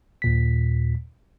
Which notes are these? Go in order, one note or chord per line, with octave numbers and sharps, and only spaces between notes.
D#2 A#2 B6